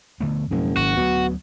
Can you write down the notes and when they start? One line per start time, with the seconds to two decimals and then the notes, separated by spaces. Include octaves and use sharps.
0.20 D3 A3 B3
0.51 F#1 F2 B2 G#3
0.77 G#1 F#4
0.97 D2 B2 E3 F#3